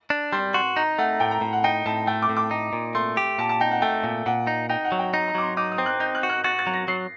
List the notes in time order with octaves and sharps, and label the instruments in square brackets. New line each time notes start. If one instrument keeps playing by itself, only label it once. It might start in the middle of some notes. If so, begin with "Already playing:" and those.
[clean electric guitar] D4
[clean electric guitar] G3 [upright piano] C6
[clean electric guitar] F#4 [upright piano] C6
[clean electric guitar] D#4 [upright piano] A#5
[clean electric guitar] A3 [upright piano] F#5
[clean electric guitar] A2 [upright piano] G5
[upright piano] A#5
[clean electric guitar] A2
[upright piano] F#5
[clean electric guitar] D#4 [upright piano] G5
[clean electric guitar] A2 [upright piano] A5
[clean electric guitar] A3 [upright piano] G5
[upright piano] D6
[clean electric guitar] A2
[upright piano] D6
[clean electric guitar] D#4
A#2
[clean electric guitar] A3 [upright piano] C6
[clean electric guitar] G4
[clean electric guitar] A#2 [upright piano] A5
[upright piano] A5
[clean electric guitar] D#4 [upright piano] G5
[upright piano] F#5
[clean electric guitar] A3 [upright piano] G5
[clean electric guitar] A#2
[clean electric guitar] A#2 [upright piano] F#5
[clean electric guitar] D#4
[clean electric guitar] D#4 [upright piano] G5
[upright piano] F#5
[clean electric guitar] F#3
[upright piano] G5
[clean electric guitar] D#4 [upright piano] A#5
[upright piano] A#5
[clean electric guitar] F#3 [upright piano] D6
[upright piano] C6
[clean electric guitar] D#4 [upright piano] D6
[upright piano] D#6
[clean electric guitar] C4
[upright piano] F#6
[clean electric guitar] D#4 [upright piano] G6
[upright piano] F#6
[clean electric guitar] F#4
[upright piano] F#6
[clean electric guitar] F#4 [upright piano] A6
[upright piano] A6
[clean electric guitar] F#3
[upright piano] A#6
[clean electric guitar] F#3 [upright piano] C7